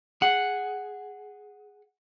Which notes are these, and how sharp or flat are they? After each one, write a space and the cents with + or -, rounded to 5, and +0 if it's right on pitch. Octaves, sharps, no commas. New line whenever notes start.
G#4 +0 F#5 +0